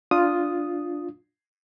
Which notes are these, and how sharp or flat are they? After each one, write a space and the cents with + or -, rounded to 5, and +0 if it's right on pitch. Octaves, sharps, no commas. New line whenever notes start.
D4 +0 F4 +0 D#6 +0